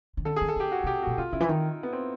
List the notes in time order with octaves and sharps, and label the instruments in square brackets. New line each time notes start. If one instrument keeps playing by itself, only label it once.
[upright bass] D#3
[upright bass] D3 [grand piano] A4
[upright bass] D#3 [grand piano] G#4
[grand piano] A4
[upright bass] D3
[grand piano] G4
F#4
[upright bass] C3
[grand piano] G4
[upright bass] A#2 [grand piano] F#4
[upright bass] C3 [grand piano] F4
[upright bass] C#3 [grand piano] E4
[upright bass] E3
[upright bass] D#3 [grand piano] D#4
[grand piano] B3
C4